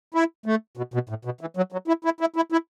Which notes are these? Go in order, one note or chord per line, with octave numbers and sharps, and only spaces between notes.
E4
A3
B2
B2
A2
B2
E3
F#3
F#3
E4
E4
E4
E4
E4